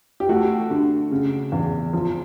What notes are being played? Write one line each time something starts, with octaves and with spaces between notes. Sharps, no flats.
G4
A3 F#4
D3
C#3
E2
F3